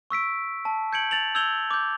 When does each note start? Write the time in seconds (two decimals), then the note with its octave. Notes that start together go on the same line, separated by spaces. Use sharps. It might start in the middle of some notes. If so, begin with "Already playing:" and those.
0.10 C#6 E6 B6 D7
0.65 A5
0.93 G6 G#6 C#7 D7 F#7
1.11 A6 F7 F#7
1.35 E6 G6 G#6 F7 G7
1.71 D6 G6